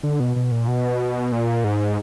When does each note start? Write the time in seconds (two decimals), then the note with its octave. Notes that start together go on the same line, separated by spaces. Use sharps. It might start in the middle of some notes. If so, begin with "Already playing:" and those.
0.03 D3
0.20 B2
0.36 B2
0.52 A#2
0.68 B2
1.32 A#2
1.64 G#2